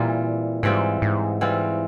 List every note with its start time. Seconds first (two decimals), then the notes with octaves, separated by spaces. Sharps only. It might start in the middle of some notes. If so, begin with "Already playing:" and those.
Already playing: A#2 E3 G3 C4 F4
0.63 G#2 E3 G3 C4 F4
1.02 G#2
1.41 E3 G3 C4 F4